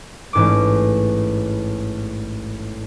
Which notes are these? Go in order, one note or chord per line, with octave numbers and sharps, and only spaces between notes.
A1 G#2 D6